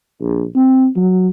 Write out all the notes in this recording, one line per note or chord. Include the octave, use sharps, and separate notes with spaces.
A#1
C4
F#3